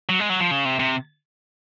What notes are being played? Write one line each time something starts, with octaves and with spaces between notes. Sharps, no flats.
F#3
G#3
F#3
F3
C#3
C3
C3